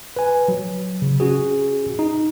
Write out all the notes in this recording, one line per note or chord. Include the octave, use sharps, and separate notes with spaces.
B4 G#5
F#3
C#3
C#4 F#4 G#4
D#4